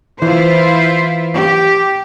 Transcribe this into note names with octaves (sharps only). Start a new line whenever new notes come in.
E3 E4 F4 C5
G4